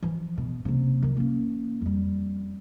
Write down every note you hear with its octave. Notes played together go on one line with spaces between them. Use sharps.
E3 F3
B2
F#1 C3
D#3 F#3
A#3 C#4
F2 G3